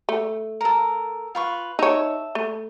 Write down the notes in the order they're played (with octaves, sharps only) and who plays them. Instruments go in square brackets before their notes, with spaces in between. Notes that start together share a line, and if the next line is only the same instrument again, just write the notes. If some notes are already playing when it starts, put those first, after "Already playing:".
[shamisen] A3
[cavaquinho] A4 A#4
F4 B4 C#6
[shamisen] D#4 C#5 [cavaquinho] E5 A5
[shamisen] A3